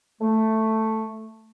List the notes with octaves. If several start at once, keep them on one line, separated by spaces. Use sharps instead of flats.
A3